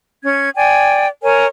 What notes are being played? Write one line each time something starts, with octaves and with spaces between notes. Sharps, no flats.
C#4 G#6
D5 G5 G#5
A#4 C#5 G#5